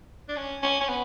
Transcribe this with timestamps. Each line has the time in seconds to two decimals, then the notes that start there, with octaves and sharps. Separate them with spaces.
0.29 D4
0.37 C#4
0.63 C#4
0.81 C#4
0.89 B3